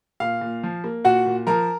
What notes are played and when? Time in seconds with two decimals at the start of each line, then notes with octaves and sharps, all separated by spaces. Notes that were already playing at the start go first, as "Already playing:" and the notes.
0.20 A#2 F5
0.41 A#2
0.63 F3
0.84 A#3
1.05 A#2 F#4 F#5
1.26 A#2
1.47 F3 A#4 A#5